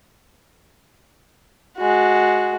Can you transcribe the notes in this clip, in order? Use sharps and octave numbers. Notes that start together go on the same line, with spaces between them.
G#3 F#4